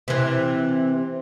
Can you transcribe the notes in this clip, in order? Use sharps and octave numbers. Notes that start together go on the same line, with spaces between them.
C3 E3